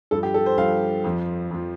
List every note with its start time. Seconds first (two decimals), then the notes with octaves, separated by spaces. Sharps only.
0.11 G2 F3 A4
0.23 G4
0.34 A4
0.46 C5
0.57 G2 F3 F5
1.04 F2 F3
1.51 F2 F3